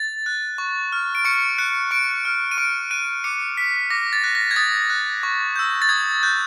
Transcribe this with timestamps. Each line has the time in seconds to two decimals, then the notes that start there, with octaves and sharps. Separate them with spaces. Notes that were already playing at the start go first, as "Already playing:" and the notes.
Already playing: A6
0.26 F#6
0.58 C#6
0.92 F6
1.15 D7
1.25 C#6 C#7
1.58 F#6 C#7
1.91 C#6 D7
2.25 F6
2.51 D#7
2.58 C#6 D7
2.91 F#6 D#7
3.24 D6 C#7
3.57 F6 B6
3.90 D6 A#6
4.13 A6
4.24 F#6
4.35 A#6
4.51 G#6
4.56 D#6 A6
4.90 F#6
5.23 C#6
5.56 E6 G6
5.82 A6
5.89 D#6 G#6
6.23 F#6 G6